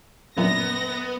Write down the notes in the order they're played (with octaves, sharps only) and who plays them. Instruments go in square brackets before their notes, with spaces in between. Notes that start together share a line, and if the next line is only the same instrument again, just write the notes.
[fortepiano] F#2 A#2 [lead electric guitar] B3 [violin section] A#6